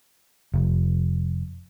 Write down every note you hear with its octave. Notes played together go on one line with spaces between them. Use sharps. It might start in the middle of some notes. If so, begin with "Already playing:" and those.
F1